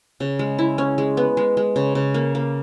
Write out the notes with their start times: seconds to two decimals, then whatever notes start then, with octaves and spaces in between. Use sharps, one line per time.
0.20 C#3
0.39 G#3
0.59 E4
0.78 C#4
0.98 G#3
1.17 B3
1.37 G#3
1.57 G#3
1.76 C#3
1.95 C#3
2.14 A#3
2.35 A#3